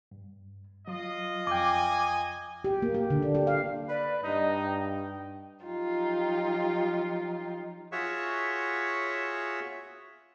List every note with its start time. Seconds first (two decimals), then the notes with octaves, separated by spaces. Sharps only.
0.11 G2
0.88 F#3 F4 D#5
1.47 F2 G5 G#5 D6
2.64 G4
2.82 A#3
2.95 G4
3.10 D3
3.22 D4
3.35 G4
3.47 F5
3.89 B4 D5
4.23 G2 D#4 D#5
4.59 G5
5.62 F3 F#3 D#4 F4 G4
7.92 F4 F#4 G#4 C#5 E5 C#6